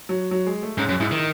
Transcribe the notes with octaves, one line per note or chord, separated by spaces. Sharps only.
F#3
F#3
G#3
A3
G#2 C#4
F#2
G#2 E4
D#3